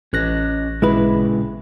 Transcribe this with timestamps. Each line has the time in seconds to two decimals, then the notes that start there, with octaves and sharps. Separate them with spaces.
0.13 A1 C#4 C#5 D#5 F#6 A#6
0.82 A#2 C#3 G#3 E4 B4